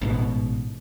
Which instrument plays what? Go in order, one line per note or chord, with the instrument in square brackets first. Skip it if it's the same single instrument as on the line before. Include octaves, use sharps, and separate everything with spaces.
[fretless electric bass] A1 G#2 B2